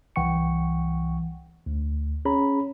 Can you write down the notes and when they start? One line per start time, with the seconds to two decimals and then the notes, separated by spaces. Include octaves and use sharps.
0.16 C2 E3 F#5 G5 C#6 C#7
1.66 D2
2.25 C#4 G#4 C#5 A#5 B5